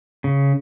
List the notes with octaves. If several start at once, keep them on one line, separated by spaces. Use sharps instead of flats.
C#3